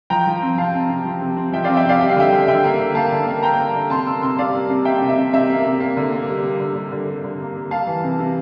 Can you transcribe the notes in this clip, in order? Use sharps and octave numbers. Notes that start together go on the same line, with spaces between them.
F3 G5 A#5
F3
C4
C3 F5 A5
C4
C3
F3
C3
C4
F3 E5 G5
C4 D5 F5
E5 G5
C3 D5 F5
G3 G5
F5
D3 E5 G5
D3
D3 E5 G5
A#3
D3
A#3 F5 A5
D3
A#3
A#3 G5 A#5
A#3
D3
C3 A5 C6
A#3 C6 E6
C3 C6 E6
G3 D5 F5
A#3
C3
A#3 E5 G5
C3
E5
C3
C3 E5
A#3
C3
A#3
D3
A#3
G3
A#3
D3
G3
D3
G3
D3
A#3
A#3
G3 F5 A5
E3
C3
C3